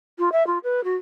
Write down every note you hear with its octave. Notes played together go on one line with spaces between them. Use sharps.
F4
E5
F4
B4
F#4